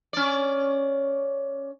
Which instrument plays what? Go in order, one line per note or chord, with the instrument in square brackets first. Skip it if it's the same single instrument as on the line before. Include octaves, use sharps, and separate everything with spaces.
[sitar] C#4 D5